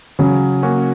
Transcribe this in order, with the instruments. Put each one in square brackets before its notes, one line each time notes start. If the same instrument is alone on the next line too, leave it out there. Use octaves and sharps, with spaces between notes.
[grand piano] C#3 [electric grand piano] F#3
[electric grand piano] A#3 C#4 F#4